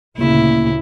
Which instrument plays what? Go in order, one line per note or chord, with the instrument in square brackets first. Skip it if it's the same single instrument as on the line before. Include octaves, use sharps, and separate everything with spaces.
[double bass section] D2 A#2 C#3 [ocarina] A#3 [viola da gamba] E4